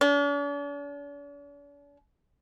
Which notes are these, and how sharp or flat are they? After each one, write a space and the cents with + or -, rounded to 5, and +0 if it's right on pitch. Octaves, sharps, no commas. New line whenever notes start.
D4 -45